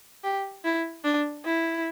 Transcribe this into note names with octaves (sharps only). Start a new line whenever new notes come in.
G4
E4
D4
E4